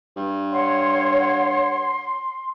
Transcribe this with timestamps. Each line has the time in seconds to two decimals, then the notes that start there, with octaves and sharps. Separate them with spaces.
0.16 G2
0.52 C#5 F#5 C6